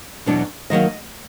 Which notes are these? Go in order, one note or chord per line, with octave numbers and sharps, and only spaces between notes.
E2 B2 F#3 B3 D4
D#3 F#3 A#3 D#5